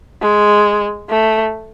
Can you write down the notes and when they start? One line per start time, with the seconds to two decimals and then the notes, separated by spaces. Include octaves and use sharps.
0.22 G#3
1.09 A3